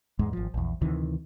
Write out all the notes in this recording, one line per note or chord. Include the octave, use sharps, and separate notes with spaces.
E2 G#2 G#3
G#1 F3
A#1 E2
D2 C3 D#3 E3